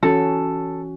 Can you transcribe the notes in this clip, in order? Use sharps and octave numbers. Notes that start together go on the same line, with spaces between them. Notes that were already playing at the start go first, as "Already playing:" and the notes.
E3 C#4 F#4 A4